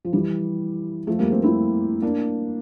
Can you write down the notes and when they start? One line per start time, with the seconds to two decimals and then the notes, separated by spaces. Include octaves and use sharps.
0.05 F3
0.13 E3 G3
1.07 F3 A3
1.19 G3 A#3
1.31 A3 C4
1.43 C4 E4
2.02 A#3 D4